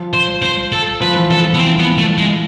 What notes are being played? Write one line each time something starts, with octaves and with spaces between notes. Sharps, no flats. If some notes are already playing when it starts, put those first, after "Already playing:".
Already playing: F3
C5
C5
A4
F3 B4
E3
F3 A4
F3
B3
E3 C4
B3
A3
G#3